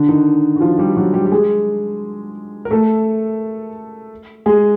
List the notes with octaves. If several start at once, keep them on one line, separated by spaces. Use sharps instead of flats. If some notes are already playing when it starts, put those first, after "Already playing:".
Already playing: D3 D4
D#3 D#4
F#4
F3 F4
G3 G4
F#3 F#4
G3 G4
G4
G#3 G#4
A#4
A3 A4
G#3 G#4